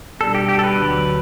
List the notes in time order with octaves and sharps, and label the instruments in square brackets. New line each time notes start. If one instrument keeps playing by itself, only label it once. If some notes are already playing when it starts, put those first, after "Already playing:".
[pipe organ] B2 G3 D4 [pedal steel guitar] A4
[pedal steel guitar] G4
G4
A4
B4
[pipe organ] D2 D3 F#3